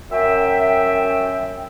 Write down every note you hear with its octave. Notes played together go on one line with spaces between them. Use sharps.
F#2 E5 G5